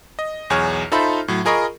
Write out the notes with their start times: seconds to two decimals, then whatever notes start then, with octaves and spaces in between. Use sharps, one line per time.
0.19 D#5
0.50 B1 E2 G#4 C#5 F6
0.92 D#4 F4 A4 C5 E5 B5
1.28 A2 F#3
1.45 F4 G#4 A#4 D#5 B5 C#6